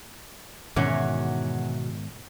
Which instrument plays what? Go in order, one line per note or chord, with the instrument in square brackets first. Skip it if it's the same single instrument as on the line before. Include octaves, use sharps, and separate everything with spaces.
[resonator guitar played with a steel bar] E2 F#3 C#4 [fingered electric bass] G#2 D#3 B3 [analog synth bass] B2